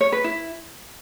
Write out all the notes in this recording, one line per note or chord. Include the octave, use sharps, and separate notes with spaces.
C#5
B4
E4